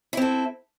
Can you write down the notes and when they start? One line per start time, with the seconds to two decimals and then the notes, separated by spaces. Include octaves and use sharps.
0.13 E4
0.17 C4
0.22 A4